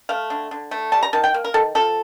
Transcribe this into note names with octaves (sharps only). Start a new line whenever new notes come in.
A3 F5
D3
D3
A3
G3 A5
A#5
D#3 A5
G5
A#3
A#4
D#3 A4
F3 A4